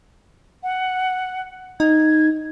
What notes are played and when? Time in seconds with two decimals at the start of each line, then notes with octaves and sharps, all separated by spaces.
0.63 F#5
1.80 D#4 G#6